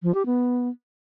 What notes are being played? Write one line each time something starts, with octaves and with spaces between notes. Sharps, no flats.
F3
G4
B3